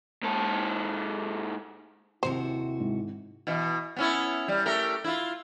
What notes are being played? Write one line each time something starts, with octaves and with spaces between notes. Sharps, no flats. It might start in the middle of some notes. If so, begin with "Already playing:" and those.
G#2 A4
D#2 C3 E4 F#4 C5
G#2
B2 E3
B3 C#4 E4
G3
A3 G4 A#4
E4 F4